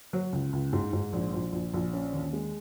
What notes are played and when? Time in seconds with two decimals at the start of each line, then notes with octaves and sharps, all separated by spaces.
0.13 F#3
0.33 C#2
0.53 C#2
0.73 G#2
0.93 G#2
1.13 A#1
1.33 A#1
1.52 A#1
1.73 A#1
1.93 C#4
2.13 D#2
2.33 G#3